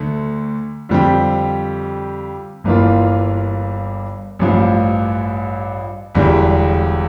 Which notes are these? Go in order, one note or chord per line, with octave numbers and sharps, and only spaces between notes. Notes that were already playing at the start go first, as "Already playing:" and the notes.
Already playing: D2 D3 A3
F2 D3 G3 C4 G4
G1 G2 E3 A#3 F4
A1 G2 F3
E1 E2 D3 G3